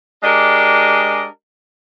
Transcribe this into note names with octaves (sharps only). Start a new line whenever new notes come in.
G#3 D4 G4 A#4 D#5